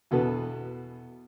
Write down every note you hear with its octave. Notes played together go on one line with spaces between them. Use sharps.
E2 B2 A4 B4